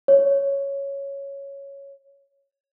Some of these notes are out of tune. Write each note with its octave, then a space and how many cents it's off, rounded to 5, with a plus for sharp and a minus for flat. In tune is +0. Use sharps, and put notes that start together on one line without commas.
C#5 +0